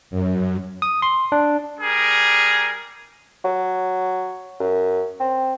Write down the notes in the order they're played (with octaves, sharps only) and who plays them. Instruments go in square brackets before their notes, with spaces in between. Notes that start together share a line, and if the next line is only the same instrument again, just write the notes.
[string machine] F#2
[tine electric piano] D#6
C6
D4
[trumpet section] G3 G#4 A#4
[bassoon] F#3
F#2
C4